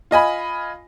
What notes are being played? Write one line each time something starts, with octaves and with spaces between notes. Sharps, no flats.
F4 D#5 G#5 B5